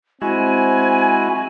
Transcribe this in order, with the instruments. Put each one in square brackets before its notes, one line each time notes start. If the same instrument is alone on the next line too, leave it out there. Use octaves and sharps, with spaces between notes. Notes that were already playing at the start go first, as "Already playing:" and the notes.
[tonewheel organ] G#3 E4 F#4 [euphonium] C4 [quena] G#5